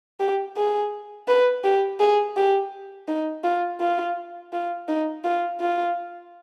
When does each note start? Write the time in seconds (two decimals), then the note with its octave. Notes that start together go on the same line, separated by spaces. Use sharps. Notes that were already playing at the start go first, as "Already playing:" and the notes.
0.20 G4
0.57 G#4
1.28 B4
1.64 G4
2.00 G#4
2.37 G4
3.08 D#4
3.44 F4
3.80 F4
4.53 F4
4.88 D#4
5.24 F4
5.60 F4